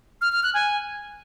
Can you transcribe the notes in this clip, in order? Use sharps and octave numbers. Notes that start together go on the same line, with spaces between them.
F6
F6
F#6
G#5